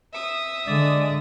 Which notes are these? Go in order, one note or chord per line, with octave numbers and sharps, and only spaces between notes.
E5 D#6
D3 G#3 D5